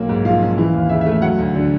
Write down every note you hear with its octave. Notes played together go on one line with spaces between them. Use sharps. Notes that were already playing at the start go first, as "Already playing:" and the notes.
Already playing: B1 A#3
G#2
F3 F5
C#4
E3
D#2
C#3 E5
E5
A3
E5
F#3 F#5
D2
D3